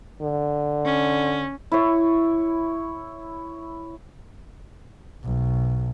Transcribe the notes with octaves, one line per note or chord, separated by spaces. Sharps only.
D3
C#4
E4 C#5
B1